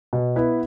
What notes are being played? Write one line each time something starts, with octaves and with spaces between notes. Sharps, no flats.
B2
B3 E4 B4